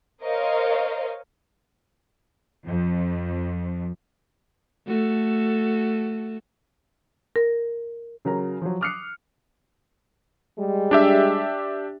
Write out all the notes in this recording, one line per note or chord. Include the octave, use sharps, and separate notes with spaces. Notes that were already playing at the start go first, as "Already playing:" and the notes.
A#4 C5 C#5 D#5 F5
F2
A3 F#4 A4
A#4
C#3 F#3 A#4 A#5
F3 F#3
D6 D#6 F6 F#6 C7 C#7
G3 G#3
D4 G4 E5